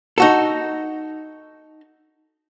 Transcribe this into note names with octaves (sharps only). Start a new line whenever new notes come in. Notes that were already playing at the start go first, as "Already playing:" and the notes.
D#4 F#4 A4